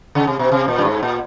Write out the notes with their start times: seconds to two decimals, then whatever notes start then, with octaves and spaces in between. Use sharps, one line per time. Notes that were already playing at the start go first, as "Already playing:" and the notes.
0.15 C#3
0.27 C3
0.39 B2
0.52 C3
0.68 A#2
0.78 G2
0.85 G#2
1.03 A#2